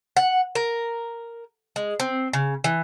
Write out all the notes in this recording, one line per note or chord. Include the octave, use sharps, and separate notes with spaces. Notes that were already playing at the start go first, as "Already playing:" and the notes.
F#5
A#4
G#3
C4
C#3
E3